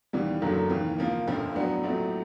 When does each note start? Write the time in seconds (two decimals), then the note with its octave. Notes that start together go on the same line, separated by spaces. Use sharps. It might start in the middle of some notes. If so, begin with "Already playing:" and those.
0.13 D#2 C#3 E3 G3 B3
0.42 F#1 F#2 D3 F#3 A3
0.69 D#2 C#3 E3
0.98 C#3 F3 A#3
1.27 G1 F2 D3 F3
1.55 A2 F#3 B3 D4
1.83 A#1 A2 F#3 A3 C4